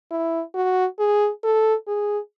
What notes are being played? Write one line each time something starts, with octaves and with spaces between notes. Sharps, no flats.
E4
F#4
G#4
A4
G#4